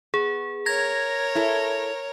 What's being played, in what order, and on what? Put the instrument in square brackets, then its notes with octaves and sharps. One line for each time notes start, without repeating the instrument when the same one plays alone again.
[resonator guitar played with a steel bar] B3 [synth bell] G#4
[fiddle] A#4 C#5 [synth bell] G#6 A#6
[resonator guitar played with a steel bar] E4 A4